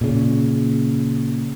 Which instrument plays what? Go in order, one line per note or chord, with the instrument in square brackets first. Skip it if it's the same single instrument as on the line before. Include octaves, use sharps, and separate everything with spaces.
[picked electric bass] A#2 C#3